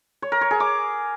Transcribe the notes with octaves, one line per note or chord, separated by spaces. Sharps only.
C#5
A#4
C#5
G#4
D6